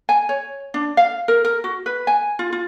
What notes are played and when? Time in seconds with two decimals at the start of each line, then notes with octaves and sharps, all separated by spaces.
0.09 G#5
0.29 C#5
0.74 D4
0.97 F5
1.28 A#4
1.45 A#4
1.64 F#4
1.86 B4
2.07 G#5
2.39 F4
2.53 F4